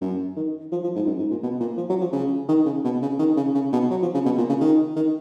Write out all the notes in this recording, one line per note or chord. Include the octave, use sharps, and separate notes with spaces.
F#2
D#3
F3
F3
G#2
F#2
G#2
A#2
B2
A#2
F3
F#3
F3
C#3
D#3
C#3
B2
C#3
D#3
C#3
C#3
B2
F#3
F3
C#3
B2
A#2
C#3
D#3
D#3